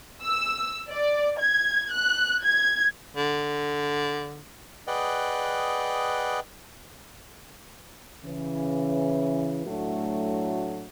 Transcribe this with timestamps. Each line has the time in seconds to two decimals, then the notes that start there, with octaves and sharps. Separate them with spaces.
0.22 E6
0.90 D5
1.40 G#6
1.92 F#6
2.43 G#6
3.16 D3
4.87 G#4 B4 D5 D#5 F#5 G5
8.24 C#3 E3
9.66 A2 F#3 A3 D4 F#4